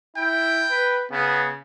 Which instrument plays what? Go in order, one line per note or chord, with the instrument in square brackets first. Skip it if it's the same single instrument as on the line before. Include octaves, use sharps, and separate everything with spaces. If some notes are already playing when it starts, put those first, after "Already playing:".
[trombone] E4 [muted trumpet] G5
[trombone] B4
[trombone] C#3 [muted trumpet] B3